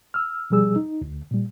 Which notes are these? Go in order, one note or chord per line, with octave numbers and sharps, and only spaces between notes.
E6 F6
B2 F3 G3 G#4 E6
D#4
D2
A#2 G3